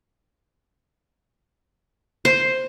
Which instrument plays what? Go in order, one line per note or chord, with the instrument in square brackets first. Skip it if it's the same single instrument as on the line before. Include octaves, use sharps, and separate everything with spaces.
[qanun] C5